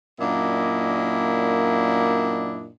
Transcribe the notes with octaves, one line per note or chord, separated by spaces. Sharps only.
F#2 A#2 A#3 D4 E4 D#5